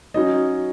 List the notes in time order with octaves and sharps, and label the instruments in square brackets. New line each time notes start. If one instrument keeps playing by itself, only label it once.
[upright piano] F#3 C#4 D#4 D#5